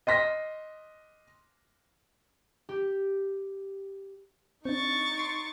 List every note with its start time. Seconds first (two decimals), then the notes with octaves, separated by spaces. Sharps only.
0.07 D#5 C6 A#6 B6
2.69 G4
4.65 C4 D4 D#4 C#6 A6
5.18 C6 C7 D7